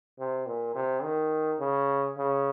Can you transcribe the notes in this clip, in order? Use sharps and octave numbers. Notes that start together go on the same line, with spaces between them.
C3
A#2
C3
D#3
C#3
C#3